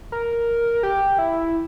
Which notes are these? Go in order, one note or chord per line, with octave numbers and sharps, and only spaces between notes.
A#4
G4
E4